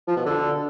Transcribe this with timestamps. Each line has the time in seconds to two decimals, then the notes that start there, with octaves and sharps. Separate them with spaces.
0.07 F3
0.17 B2
0.26 D3